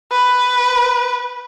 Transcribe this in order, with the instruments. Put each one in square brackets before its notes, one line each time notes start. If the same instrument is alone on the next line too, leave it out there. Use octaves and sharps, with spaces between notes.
[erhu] B4